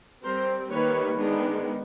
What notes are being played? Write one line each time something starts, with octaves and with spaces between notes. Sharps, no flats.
G3 C4 A#4 C5
D#3 G3 A#3 B4 C#5
D#3 G#3 B3 D4